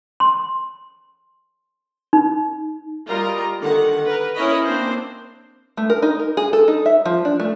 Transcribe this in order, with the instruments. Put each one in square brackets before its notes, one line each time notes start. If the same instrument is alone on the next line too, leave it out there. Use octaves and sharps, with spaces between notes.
[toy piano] C6
D#4
[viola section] G3 F4 A#4 D#5 A#5
D3 D#3 F#5
A#4 B4
C#4 E4 A#4 C#5 D#5 B5
A#3 C4 D4 C5
[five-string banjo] A3
A#4
D#4
A#4
G#4
A4
D#4
E5
F3
D4
A3